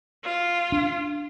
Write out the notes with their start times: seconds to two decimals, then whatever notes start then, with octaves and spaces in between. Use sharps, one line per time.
0.24 F4
0.72 D4